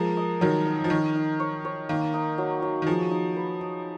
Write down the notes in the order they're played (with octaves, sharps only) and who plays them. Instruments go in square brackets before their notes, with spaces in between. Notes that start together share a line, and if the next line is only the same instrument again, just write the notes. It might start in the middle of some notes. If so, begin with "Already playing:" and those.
Already playing: [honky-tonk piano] F3 G#3 [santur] A#4
[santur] D#5
[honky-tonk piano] D#3 F#3 [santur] A#4
[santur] D#4
[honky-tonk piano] F3
[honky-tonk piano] D#3 [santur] C#5
[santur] D#4
C#5
C#5
[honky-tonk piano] D#3 [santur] A#3
[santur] D#4
F#3
F#3
[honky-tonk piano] D#3
[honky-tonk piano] F3 [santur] G#4
[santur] D#4
B4
D#4